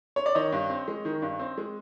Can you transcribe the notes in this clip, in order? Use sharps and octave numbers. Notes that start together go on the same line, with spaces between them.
C#5
D5
D#3 C#5 D#5
G2
C4
G#3
D#3
G2
C4
G#3